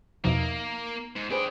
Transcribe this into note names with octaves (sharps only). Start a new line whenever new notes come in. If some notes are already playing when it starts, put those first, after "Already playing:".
E2 B2 F3 A#3 D#4 E5
G#2
D4 G#4 B4 C5 G5